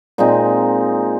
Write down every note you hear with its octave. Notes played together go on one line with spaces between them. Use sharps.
A#2 G#3 C4 D#4